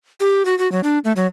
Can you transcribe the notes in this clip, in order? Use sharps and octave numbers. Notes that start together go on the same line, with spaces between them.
G4
F#4
F#4
F#3
D4
A3
F#3